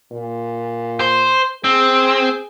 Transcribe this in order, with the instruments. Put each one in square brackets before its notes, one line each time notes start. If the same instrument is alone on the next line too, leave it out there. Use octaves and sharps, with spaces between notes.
[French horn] A#2
[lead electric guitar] C5
[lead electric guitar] C4 [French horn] G#4